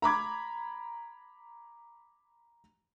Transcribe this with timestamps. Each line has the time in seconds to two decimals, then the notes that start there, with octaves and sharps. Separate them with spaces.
0.02 A#5 B5 D6 G#6